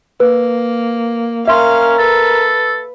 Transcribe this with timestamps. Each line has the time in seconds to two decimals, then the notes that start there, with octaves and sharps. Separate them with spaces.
0.20 A#3 B4
1.48 C#4 A#4 E5 F5 C6
1.99 A4 B4